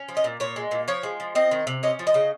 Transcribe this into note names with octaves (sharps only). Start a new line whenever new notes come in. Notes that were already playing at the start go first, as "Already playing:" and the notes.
Already playing: C#4
F3
D#5
A#2
A#2 C#5
G#3
A#2
F3 C#5
G#3
F3
C4 D#5
D#3
C3
C#4 D#5
F3
D#5
C#3